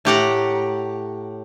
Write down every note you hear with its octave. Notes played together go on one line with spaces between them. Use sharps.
A2 G4 F#5 A#5